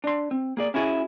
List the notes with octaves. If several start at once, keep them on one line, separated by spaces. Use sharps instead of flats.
D4 C6
C4
A#3 G#4 D5
C#4 E4 F#4 G#4